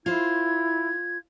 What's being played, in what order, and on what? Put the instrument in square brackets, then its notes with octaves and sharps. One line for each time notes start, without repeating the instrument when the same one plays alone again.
[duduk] E4 [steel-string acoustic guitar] F4 C5 [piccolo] G#6